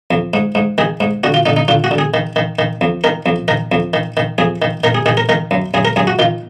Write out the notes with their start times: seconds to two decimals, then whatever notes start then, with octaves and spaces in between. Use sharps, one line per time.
0.11 F2
0.34 G#2
0.55 G#2
0.78 D#3 G#4
1.00 G#2
1.24 D3 F#4
1.34 F4
1.46 D3 D#4
1.57 D#4
1.68 D3 F4
1.84 F#4
1.91 D3
1.98 G#4
2.14 D#3
2.36 D#3
2.59 D#3
2.81 F2
3.04 D#3 A#4
3.26 F2
3.48 D#3 A#4
3.72 F2
3.94 D#3
4.17 D#3
4.38 F2 G#4
4.62 D#3
4.84 D#3 A#4
4.95 G#4
5.06 D#3 G#4
5.17 A#4
5.29 D#3 A#4
5.51 F#2
5.74 F#2 G#4
5.85 A#4
5.96 F#2 G#4
6.07 F#4
6.19 D#3 F4